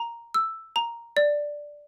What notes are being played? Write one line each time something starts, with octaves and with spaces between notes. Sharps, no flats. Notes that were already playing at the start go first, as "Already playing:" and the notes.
Already playing: A#5
E6
A#5
D5